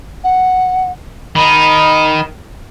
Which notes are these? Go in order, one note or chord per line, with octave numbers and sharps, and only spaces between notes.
F#5
D#3 D#4 B5